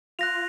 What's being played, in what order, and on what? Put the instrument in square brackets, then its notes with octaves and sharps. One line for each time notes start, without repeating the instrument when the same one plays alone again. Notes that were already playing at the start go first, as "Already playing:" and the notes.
[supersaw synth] F4 [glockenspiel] F#6 A#6 F7